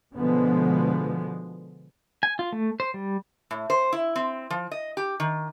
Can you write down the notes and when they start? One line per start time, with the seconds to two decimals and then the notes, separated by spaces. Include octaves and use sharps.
0.16 B2 D3 F3 G#3 B3
2.23 G#5
2.39 F4
2.52 A3
2.80 C5
2.94 G3
3.51 A2
3.70 C5
3.92 E4
4.16 C4
4.50 F3
4.71 D#5
4.97 G4
5.20 D#3